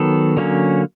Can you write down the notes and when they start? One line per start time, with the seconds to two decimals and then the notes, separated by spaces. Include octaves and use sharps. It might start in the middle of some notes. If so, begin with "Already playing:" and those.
Already playing: D#3 F#3 B3 A4
0.37 D3 F#3 A#3 C#4